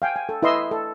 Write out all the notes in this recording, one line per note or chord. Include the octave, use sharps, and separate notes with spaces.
F5 G5 G#5
G#5
A4
E4 B4 D#5 C6 E6
A4